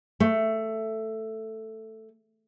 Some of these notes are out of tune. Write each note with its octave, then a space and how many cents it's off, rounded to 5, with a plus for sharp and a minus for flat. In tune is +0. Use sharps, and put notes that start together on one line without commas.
A3 +5